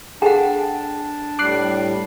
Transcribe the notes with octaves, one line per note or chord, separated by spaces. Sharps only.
D4 G#4 A4 F#5 G5
A2 G3 D6 F#6 C7